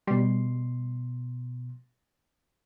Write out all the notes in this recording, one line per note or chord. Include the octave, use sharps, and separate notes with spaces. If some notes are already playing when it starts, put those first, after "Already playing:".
B2 G3 C6